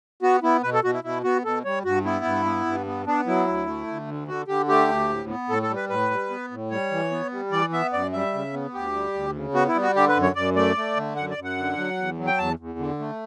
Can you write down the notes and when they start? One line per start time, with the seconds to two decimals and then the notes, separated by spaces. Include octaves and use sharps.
0.22 B3 F#4
0.43 B3 E4
0.63 B2 B4
0.73 A4
0.84 B2 F#4
0.93 E4
1.04 B2 E4
1.24 B3 F#4
1.44 B2 A4
1.65 G3 C#5
1.85 G2 F#4
2.04 B3 E4
2.25 G2
2.45 B3
2.66 G2
2.86 B3
3.06 B3 D4
3.27 F#3 E4
3.47 D2
3.67 A3
3.87 D2
4.07 D3
4.28 D3 F#4
4.48 D3 G4
4.68 A3 G4
4.88 D2
5.09 A2
5.29 B3
5.49 A2 A4
5.63 A4
5.70 G3
5.76 B4
5.89 A2 B4
6.11 G3
6.30 B3
6.51 A2
6.71 G3 C#5
6.91 E3
7.11 B3
7.32 G3
7.51 E3 D5
7.72 B3 E5
7.93 F#2 D5
8.12 G3 E5
8.34 C#3
8.53 B3
8.74 D2 G4
8.93 G3
9.14 D2
9.34 C#3
9.54 B3 F#4
9.68 E4
9.74 G3
9.82 F#4
9.95 D3 G4
10.08 B4
10.16 F#2
10.22 C#5
10.35 F#2 D5
10.56 A3 D5
10.77 A3
10.97 D3
11.16 F#2 F#5
11.30 D5
11.37 F#2
11.44 F#5
11.57 D3
11.77 F#3
11.97 E2
12.17 F#3
12.27 G5
12.38 E2 A5
12.59 E2
12.79 D3
12.99 A3